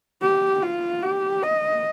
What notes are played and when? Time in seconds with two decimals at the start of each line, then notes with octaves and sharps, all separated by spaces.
0.22 G4
0.63 F4
1.03 G4
1.43 D#5